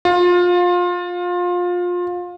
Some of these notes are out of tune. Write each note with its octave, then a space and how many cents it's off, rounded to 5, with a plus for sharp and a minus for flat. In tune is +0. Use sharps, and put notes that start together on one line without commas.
F4 +25